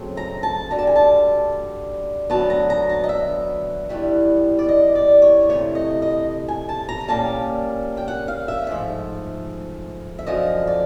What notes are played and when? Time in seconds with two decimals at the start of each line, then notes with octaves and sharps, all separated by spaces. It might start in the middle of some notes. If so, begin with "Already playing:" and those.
Already playing: C#3 F#3 A3 C4
0.17 A#5
0.43 A5
0.71 D2 D3 G3 A#5
0.79 A5
0.87 G#5
0.96 A5
2.30 D2 D3 F#3 B3 A5
2.50 A#5
2.70 A#5
2.90 A5
3.04 D#5
3.09 E5
3.89 G2 E3 G3 B3 E4
4.59 D5
4.69 D#5
4.95 D5
5.22 C#5
5.49 C3 E3 A3 C#5
5.75 D#5
6.02 D#5
6.48 G#5
6.69 A5
6.89 A#5
7.08 A#2 G3 A#3 C#4 A5
7.97 G5
8.08 F#5
8.28 F5
8.48 E5
8.67 G#2 F3 A3 E5
10.19 E5
10.27 F#2 D3 F3 D#5
10.67 D5